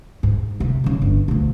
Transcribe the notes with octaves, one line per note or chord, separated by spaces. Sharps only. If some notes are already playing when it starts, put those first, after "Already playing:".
G#2
C3
G#1 C#3
G1
D2 A#2